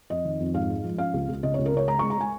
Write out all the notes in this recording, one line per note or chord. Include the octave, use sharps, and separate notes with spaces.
F2 D#5
D#3
F2
G#2 F5
G#3
F3
C#4 F5
C#2
C#2
C#3 D#5
C#5
C#2
A#4
C#3 C#5
G#3 A#5
C#6
G#3
A#5
G#3 G#5